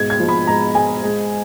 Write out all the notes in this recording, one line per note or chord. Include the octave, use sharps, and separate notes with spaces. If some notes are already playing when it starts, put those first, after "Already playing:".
Already playing: G#2 B2 G#6
G#6
F3
B5
G#2 A#5
G#3 G#5
G#3